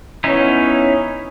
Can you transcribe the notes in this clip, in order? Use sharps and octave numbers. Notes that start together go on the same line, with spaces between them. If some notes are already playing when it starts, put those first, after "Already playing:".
B3 C#4 D#4 E4 C#5